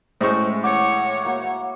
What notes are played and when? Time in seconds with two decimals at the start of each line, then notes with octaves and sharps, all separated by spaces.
0.21 A2 G#3 C#4 E4 C5 C#6
0.64 C#5 F#5 D6
1.25 A#3 F#4